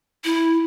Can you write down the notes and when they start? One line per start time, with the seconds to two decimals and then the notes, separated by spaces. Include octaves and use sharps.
0.25 E4